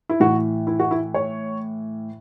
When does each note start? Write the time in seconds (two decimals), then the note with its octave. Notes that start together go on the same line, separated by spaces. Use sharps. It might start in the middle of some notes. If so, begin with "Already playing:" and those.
0.09 E4
0.20 A2 E3 F#4
0.67 E4
0.79 F#4
0.91 E4
1.14 C#5